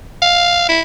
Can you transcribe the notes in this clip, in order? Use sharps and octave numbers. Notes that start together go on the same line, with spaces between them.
F5
E4